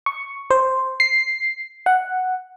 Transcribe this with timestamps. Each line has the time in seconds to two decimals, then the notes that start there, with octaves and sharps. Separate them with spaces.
0.06 C#6
0.51 C5
1.00 C7
1.86 F#5